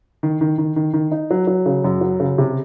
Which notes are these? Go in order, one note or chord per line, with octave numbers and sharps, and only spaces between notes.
D#3
D#3
D#3
D#3
D#3
D#4
F#3
F#3
C#3
F#2
F#3
C#3
C3